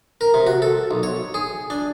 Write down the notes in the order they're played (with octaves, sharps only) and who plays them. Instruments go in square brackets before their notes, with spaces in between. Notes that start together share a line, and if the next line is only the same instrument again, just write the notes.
[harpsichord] A#4
C3
F#4
A4
B1
C#5
G#4
D4